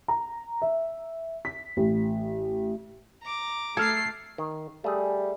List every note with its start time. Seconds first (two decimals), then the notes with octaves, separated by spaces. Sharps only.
0.08 A#5
0.62 E5
1.45 B6
1.77 A1
3.22 A#5 D6
3.77 A3 A4 F6 G#6 C7
4.38 D#3
4.84 G3 A3 G#4